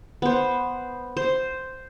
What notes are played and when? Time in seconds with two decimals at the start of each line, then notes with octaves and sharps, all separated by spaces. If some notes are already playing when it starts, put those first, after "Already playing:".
0.22 B3 C5
1.17 C5